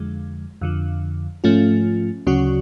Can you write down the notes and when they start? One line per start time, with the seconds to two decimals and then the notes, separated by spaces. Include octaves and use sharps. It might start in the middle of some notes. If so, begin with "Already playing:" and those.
Already playing: F2 D3 F3 G#3
0.61 F2 D3 F3
1.44 G#2 F3 A3 C#4 F4
2.27 D2 C#3 F#3 C#4 F#4